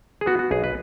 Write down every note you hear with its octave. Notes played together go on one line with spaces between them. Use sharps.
G#4
B3 F#4
F#4
B1 G#4
B4